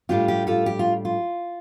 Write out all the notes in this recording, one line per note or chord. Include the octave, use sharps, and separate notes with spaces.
A2 G3 D4 F4 G4
G4
F4 A4
G4
F4
F4